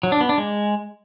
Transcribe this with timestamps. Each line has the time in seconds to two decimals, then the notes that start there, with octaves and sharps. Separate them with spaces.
0.03 F#3
0.12 D4
0.21 B3
0.29 D4
0.38 G#3